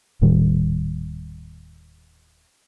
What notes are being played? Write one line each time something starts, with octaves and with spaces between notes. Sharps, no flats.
D#1 A2 D#3 G3